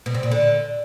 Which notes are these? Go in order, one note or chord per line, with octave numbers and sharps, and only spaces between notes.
B2
C3
A#2
D3